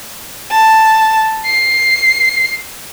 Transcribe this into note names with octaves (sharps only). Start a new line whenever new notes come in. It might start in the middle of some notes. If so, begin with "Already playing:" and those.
A5
C7